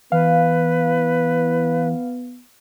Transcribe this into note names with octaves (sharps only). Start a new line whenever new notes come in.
E3 B3 B4 F5